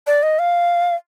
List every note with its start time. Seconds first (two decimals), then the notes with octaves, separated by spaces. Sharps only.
0.07 D5
0.23 D#5
0.39 F5